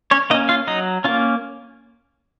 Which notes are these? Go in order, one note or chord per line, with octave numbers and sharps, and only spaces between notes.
C#4 C#5
A#3 C#4 D#4 D#5
F4 F5
F#3 D#4 D#5
A#3 C#4 F4